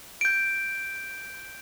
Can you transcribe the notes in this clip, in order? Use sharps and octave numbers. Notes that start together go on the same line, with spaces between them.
G6 D7